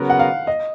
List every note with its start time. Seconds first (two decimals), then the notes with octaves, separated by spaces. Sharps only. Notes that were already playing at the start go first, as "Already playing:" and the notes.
Already playing: C#3 F#3 B3 F#4 A#4
0.10 F#5
0.19 F5
0.47 D#5